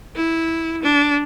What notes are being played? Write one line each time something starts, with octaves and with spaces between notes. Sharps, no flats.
E4
D4